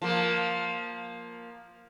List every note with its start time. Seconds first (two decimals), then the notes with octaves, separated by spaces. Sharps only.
0.02 F3 A#3